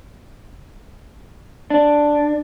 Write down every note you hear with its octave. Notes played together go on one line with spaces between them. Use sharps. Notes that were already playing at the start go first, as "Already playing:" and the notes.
D4